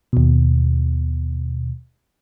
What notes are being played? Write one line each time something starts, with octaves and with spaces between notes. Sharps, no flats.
D#2 B2